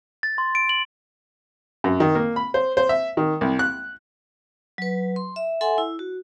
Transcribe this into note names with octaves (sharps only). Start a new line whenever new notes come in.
A6
C6
D7
F#7
F#2
D#3
A#3
B5
C5
C5
E5
D#3
C2
F#6
F#3 B4
C6
E5
A4 E5 F#5 G#5 C6
E4
F#4